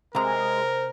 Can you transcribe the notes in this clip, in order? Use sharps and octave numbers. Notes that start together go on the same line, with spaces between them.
C3 G#3 A#4 C5 A#5